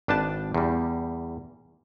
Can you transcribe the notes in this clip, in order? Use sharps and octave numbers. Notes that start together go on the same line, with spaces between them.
G#1 D4 B4 G5 A5
E2 G3